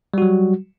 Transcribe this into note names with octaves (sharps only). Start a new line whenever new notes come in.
F#3 G3 F#4